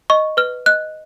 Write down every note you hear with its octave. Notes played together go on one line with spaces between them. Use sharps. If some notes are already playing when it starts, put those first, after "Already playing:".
D#5 C#6
B4 F6
D#5 F#6